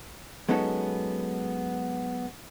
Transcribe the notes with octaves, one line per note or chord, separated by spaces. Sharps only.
F#3 G#3 B3 C#4 D#4 A4